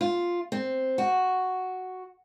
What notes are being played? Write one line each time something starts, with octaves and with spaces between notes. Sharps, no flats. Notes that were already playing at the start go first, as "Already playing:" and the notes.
F4
C4
F#4